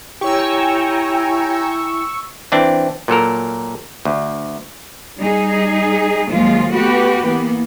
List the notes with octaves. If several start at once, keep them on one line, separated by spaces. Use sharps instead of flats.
E4 G4 C#5 G5 G#5 A#5 C#6 E6
E3 C4 D4
A#2 F#3 A4 A#4
D2
G3 D#4 G#4
D#2 F3 F#3 G#3 F4
A3 B3 F#4 G4 B4
E3 A#3 B3